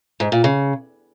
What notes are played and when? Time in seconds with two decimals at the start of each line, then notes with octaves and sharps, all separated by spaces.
0.20 G#2
0.32 A#2
0.44 C#3